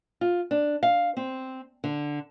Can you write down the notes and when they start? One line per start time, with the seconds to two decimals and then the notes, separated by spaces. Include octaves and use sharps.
0.21 F4
0.51 D4
0.83 F5
1.17 C4
1.84 D3